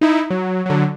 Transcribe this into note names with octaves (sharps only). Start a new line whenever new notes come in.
D#4 E4
F#3
D3 F#3